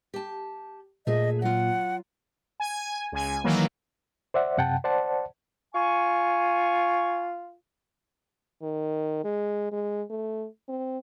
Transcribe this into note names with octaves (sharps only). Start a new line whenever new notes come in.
G4 A5
A#2 A3 G#4 D#5 E5
F#3 F4 F#5
G#5
C#2 G#5
D#3 E3 F#3 A#3
C5 D5 E5 F#5
F#2 C3 F#5 G5 A5
C5 D5 F#5 A5
F4 G#5 C#6
D#3
G#3
G#3
A3
C4